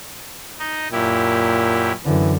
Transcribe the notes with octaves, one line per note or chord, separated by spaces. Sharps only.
D#4 D#5
F#2 A#2 E4 G4
F#2 D3 E3